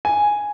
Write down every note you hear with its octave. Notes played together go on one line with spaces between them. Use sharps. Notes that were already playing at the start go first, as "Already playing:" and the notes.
G#5